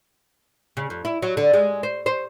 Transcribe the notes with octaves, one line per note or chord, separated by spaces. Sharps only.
C#3
F2
E4
F#3
D3
G#3
C5
C5